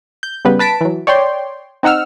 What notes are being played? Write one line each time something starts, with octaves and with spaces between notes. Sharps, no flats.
G6
C#3 G3 B3 B4
B4 A5 B6 D7
E3 F#3
C#5 D5 G5 C6
C4 D#4 F#5 E6 F6